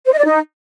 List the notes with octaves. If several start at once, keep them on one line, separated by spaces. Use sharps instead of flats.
C5
D#5
D5
D#4